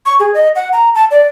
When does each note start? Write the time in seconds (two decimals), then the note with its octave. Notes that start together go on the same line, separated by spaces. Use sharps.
0.06 C#6
0.20 G#4
0.34 D#5
0.56 F#5
0.73 A#5
0.95 A5
1.11 D5